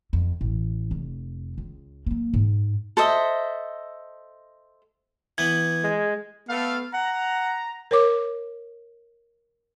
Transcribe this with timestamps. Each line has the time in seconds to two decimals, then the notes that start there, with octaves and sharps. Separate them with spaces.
0.13 F2
0.41 A1
0.91 F1
1.58 C#2
2.06 F#3 A#3
2.33 G#2
2.97 A4 C5 D#5 E5
5.38 E3 B3 B4 G#6
5.84 G#3
6.49 A3 B3 A4 F5
6.93 F#5 A#5
7.91 A#4 C#5 D6